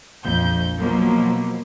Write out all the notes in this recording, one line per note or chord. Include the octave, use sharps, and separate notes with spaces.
A#1 F2 G6
B2 F3 F#3 A#3